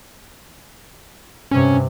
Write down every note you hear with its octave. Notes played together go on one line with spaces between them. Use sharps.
G2 C3 C#4